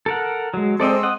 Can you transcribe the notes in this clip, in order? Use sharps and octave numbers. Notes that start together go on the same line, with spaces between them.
A4 A#4 F#5
F#3 G#3
G#3 C4 A4 D5 D#5
D#5 F#5